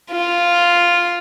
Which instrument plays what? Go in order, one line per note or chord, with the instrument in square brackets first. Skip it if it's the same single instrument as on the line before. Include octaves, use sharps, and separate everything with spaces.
[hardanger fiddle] F4